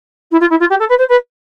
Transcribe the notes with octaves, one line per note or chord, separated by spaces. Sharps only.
E4
F4
E4
F4
G4
A4
B4
C5
B4